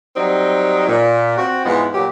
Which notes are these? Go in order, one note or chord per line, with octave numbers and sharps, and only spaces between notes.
F#3 G3 C4 D#4
A#2
C4 F#4
E2 G#2 F3 G#3 B3
A#2 F#3 G4